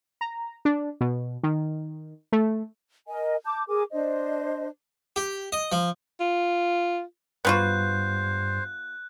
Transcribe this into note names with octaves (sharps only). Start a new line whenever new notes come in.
A#5
D4
B2
D#3
A3
A#4 D#5 G#5
A5 D6 G6
G#4 A#4 G#5 D6
D4 C5 D#5
G4
D#5
F3
F4
G2 B3 F4 F#4 C5 F#6